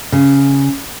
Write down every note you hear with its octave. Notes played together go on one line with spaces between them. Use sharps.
C#3